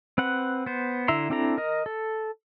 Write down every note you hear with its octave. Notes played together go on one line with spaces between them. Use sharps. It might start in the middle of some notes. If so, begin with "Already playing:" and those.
C4 B4 F#5
B3 C5
D3 E4 E5 A#5 C6
C4 D4 E4 A4 A#5
A#4 D#5
A4